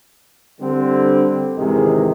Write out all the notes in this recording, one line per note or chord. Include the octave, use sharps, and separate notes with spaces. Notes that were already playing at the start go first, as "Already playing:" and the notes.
D3 G3 C4
G#1 C#2 C3 D#3 E3 G#3